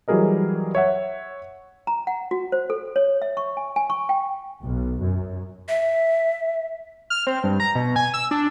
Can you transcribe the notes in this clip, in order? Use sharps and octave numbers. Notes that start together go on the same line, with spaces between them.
E3 F#3 G3 G#4 A#4 D#5
C#5 E5 F#5
A#5
F#5
F#4
C5
A4
C#5
E5
C#6
G#5
G#5
C#6
G5
B1
F#2
E5
F6
C4
G2
A#5
B2
G#5
E6
D4